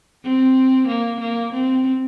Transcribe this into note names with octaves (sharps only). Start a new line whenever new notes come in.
C4
A#3
A#3
C4